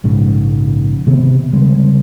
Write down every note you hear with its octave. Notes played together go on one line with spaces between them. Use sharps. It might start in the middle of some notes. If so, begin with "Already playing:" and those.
A#1 G#2 C#3
C3 D#3 B3 C4
C#3 G3 G#3 C4